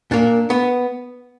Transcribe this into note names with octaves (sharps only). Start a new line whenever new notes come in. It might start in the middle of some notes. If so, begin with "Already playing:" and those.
A#2 A#3 D4
B3